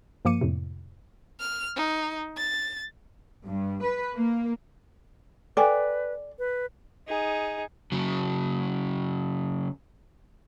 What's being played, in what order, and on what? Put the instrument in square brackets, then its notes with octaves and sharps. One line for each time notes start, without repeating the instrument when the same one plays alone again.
[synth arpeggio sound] G2 F3 A#3 D6 C#7 D#7
F2 A2 C3
[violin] F6
D#4
A6
[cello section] G2
B4
A#3
[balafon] A4 G5 G#5 [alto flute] B4 [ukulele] D5
[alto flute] B4
[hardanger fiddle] D#4 G#4
[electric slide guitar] C#3 F#3